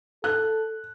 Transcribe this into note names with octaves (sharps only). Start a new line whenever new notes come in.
A4 F#6